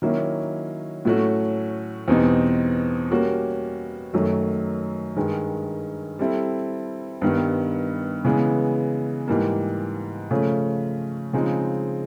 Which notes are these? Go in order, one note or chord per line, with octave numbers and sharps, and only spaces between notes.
D#3 F#3 A#3 C#4 E4
A2 F#3 A3 C#4 F#4
E2 B2 G3 C4 D#4
G3 A#3 C#4 F#4
F#2 D#3 F#3 A3
G2 D#3 G#3
G3 C4 E4 A4
G2 D#3 G3 B3
C#3 E3 G#3 B3
G#2 E3 G3 A#3
C#3 F3 A3 C#4
C#3 F3 G#3 C4 D#4